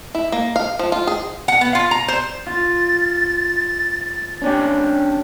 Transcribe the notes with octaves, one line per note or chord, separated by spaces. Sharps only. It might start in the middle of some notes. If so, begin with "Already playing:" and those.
E4
A#3
F5
F3
F4
G#4
F#5
B3
F4
A#5
C5
F4 A6
C#4 D4 G4